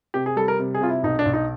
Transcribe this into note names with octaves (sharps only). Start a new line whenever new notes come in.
C3 G4
G#4
G3 A4
A#4
C3
G#4
C3 F4
E4
B1 D#4
D4
B1
D#4